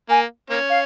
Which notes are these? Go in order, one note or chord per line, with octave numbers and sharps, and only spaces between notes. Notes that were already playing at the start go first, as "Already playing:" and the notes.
A#3 G#5
A#3 C#4
F5